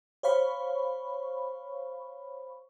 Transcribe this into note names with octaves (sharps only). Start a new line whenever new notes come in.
C5 C#5 F5 B5 C#6